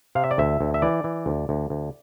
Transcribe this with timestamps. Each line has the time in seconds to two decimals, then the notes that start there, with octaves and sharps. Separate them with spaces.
0.15 C3 F5
0.24 E5
0.31 D5
0.38 D2 E5
0.61 D2
0.74 E5
0.82 E3 D5
1.04 E3
1.26 D2
1.49 D2
1.70 D2